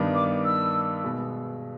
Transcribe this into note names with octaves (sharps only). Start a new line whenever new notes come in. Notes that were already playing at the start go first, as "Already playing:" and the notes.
Already playing: G2 D#3 G3 B3 D4
D6
E6
B2 G#3